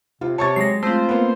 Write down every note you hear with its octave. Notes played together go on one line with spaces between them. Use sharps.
C3 F4
C3 C#5 A5 C#6 A6
F#3 G#3 A#6 C7
A3 C4 F4 C5
A#3 B3